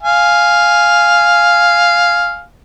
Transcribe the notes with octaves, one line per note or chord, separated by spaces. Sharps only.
F5 G#5